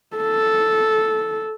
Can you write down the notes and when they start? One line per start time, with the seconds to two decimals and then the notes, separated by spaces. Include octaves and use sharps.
0.17 A4